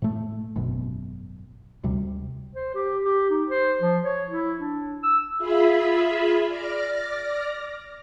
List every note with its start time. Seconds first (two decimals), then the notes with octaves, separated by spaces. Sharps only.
0.02 A2 A3
0.56 G#1 F#2 B2
1.84 D2 C3 G3
2.55 C5
2.75 G4
3.05 G4
3.30 D#4
3.50 C5
3.81 F3
4.05 C#5
4.31 E4
4.60 D4
5.03 E6
5.38 F4 G#4 E5 B5
6.48 D5 D6 F6 A#6